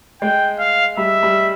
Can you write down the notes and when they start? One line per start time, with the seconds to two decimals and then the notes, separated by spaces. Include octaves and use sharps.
0.22 G#3 G5
0.59 F5
0.97 G3 E5
1.23 G3